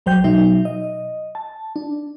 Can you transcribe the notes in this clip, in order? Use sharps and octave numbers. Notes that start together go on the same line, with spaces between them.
B1 F#3 C5 G5 G6
B2 F#3 D#4 E5
D#5
A5
D4